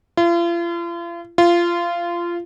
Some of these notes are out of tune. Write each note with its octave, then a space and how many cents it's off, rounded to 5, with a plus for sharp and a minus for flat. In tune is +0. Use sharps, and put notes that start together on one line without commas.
F4 -40
F4 -20